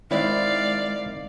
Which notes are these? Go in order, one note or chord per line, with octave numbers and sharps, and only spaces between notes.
D#3 G#3 C4 E4 D5 F5